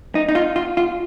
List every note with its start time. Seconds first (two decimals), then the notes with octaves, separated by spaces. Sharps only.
0.15 D#4
0.29 D#4
0.35 F4
0.56 F4
0.77 F4